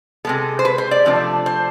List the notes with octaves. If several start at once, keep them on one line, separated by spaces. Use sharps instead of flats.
C3 G#3 B3 A4
C5
B4
C5
D5
C3 F3 A3 D4
C5